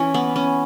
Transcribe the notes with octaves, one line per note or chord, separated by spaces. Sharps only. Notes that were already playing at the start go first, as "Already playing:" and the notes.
Already playing: E3 C#4
B3
C#4